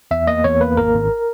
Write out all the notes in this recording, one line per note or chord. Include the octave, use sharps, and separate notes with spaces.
E2 E5
A#3 D#5
E2 C#5
A#3 B4
G#1 A#4
G#1